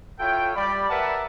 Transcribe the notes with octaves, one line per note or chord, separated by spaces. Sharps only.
E4 F4 A4 C#5 G5
G3 D5 B5
A#4 B4 D5 E5 F#5 A5